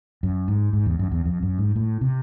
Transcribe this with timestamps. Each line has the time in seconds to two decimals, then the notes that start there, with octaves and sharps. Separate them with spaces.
0.23 F#2
0.48 G#2
0.73 G#2
0.86 E2
0.99 F#2
1.11 E2
1.25 F2
1.43 F#2
1.59 G#2
1.76 A2
2.01 C3